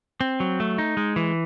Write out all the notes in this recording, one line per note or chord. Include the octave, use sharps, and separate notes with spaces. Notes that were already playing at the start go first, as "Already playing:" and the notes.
C4
F#3
A3
D#4
G#3
E3